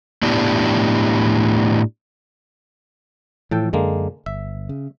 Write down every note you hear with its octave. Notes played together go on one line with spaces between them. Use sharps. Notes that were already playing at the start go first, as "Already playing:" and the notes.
A2 B3 D4 E4 G4
A2 E3 F3 A4 G5
F#2 D3 G#3 A#3
G1 E5
C#3